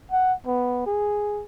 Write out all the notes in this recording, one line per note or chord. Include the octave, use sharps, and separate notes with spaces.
F#5
B3
G#4